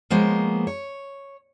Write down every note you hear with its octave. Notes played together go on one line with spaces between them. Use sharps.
F3 G#3 A#3 B3 C5 C#5
C#5